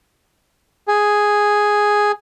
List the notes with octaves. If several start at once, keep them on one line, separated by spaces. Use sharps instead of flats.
G#4